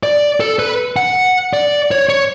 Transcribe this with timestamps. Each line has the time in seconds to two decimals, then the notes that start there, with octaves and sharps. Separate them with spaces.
0.03 D5
0.40 A4
0.59 B4
0.97 F#5
1.53 D5
1.91 C#5
2.09 C#5